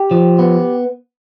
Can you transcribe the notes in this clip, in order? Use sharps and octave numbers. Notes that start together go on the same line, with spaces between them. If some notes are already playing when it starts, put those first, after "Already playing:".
Already playing: G4
F3
B3